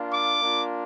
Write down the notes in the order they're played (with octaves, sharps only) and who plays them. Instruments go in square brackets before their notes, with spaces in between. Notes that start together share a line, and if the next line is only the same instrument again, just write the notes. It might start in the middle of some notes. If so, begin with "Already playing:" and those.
Already playing: [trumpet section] A#3 D4 F4
D6
A#3 D4 F4